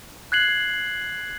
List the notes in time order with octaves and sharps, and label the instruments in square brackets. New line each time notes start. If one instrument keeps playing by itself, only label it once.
[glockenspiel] F#6 G#6 C7 F#7